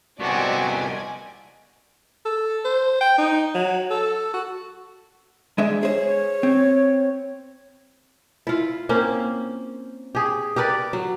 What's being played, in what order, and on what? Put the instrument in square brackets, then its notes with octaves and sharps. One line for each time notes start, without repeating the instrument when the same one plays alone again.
[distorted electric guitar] C2 B3 [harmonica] C4 D4 F#4 [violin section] D5 D#5 G#5
[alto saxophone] A4
C5
G5
D#4
F#3
A4
F#4
[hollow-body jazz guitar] G#3 D4 E5
[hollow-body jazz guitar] G#4 C5 [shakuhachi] C#5
[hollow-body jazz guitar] C4
[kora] E4 F4
A#3 C4 C#4
G4 G#4
G4 A#4 B4 D5
F#3